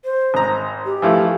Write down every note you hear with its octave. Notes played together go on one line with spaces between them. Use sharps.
C5
G#1 A#5
G4
E3 F3 A3